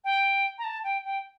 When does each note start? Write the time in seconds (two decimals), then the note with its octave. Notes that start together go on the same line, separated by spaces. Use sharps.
0.04 G5
0.58 A#5
0.64 A5
0.84 G5
1.04 G5